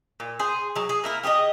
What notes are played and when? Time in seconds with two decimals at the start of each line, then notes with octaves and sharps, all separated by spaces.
0.20 A#2
0.39 G#4 C5
0.75 F#3 G#4
0.89 G#4
1.04 A#3 E4 A#4
1.23 G4 G#4 B4 D#5